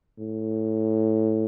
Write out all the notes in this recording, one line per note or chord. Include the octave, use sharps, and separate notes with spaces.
A2